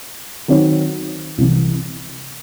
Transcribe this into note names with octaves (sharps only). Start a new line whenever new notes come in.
D#3 F#3 C4 F#4 C#5
C2 C3 E3